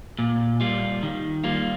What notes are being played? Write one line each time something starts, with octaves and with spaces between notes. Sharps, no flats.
A#2
G3 A#3 F4
D#3
G3 A#3 F4